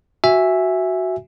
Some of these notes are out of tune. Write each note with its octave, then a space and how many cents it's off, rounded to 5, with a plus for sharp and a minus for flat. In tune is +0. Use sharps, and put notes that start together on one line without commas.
F#4 +5 E5 +0 G#5 -10